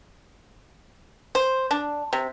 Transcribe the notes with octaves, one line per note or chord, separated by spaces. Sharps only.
C5
D4
C3